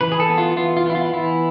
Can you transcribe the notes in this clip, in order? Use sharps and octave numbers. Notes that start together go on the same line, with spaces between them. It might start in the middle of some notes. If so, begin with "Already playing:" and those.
E3 B4
G#4
A4
B3
F4
E3 F4
F4
B3 E4
F4
E3 E4